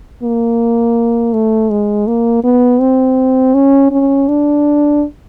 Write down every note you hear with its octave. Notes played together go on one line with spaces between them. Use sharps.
A#3
A3
G#3
A#3
B3
C4
C#4
C#4
D4